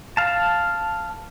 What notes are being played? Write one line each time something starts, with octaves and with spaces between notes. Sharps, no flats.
F5 A5